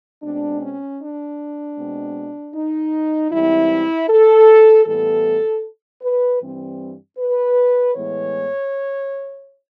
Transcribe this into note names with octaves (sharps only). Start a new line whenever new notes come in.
B2 G#3 C4 D4
C#4
D4
B2 G#3 C4
D#4
G#2 E3 G3 C4 E4
A4
A2 E3 G3 B3 A4
B4
G2 E3 G3 C4
B4
A2 E3 G#3 B3 C#5